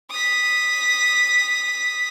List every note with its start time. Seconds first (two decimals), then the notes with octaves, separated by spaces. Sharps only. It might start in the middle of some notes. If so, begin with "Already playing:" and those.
0.11 D#6 B6